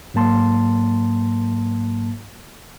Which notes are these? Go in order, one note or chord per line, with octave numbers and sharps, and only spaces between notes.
G#2 F#3 A#3 A5 C6